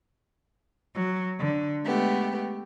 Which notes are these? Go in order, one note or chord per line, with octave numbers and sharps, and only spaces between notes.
F#3
D3
G#3 A3 B3 G4